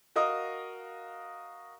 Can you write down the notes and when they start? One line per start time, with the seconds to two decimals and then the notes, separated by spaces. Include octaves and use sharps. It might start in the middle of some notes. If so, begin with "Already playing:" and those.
0.16 F#4 A#4 D#5 F5 D#6